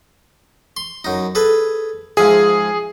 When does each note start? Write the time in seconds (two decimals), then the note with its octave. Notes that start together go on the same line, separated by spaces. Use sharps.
0.77 C6
1.04 F#2 D#4
1.35 G#4 A4 B4
2.17 G#2 F3 G#4 E5